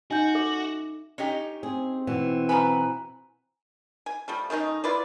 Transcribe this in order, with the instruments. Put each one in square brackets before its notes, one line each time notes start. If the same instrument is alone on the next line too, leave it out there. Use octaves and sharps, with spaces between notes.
[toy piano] C#4 D#4 D#5 [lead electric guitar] F#4 [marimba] G#5 G6
[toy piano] A4 E5 D6
[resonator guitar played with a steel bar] C#4 D#4 G4
[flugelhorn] C4 [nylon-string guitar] G#4
[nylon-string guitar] B2 E3
[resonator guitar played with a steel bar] F#2 B3 B4 [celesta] G#5 A#5
[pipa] G#5
F3 G3 A3
D#3 A3 C#4 D#4
E4 F4 B4 D5